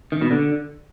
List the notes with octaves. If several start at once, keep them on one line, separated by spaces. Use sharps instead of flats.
D#3
B2
D3